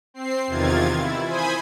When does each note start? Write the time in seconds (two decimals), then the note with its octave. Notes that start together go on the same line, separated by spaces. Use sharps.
0.14 C4 C7
0.47 E2 C3 D#3 F4 G#6 A6
0.96 E4
1.25 C5 G#5 B5 D#6 G#6